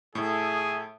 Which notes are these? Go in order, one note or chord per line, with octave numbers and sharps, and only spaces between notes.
A2 G#4 A4 E5